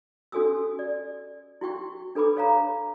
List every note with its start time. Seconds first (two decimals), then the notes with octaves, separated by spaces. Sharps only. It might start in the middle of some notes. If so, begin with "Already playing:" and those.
0.32 C#4 F#4 A4 G#5 D#6 E6
0.79 D5
1.61 E4 F#4 G5 C#6
2.15 D4 A4 B4 B5 D6
2.37 C#5 F5 A#5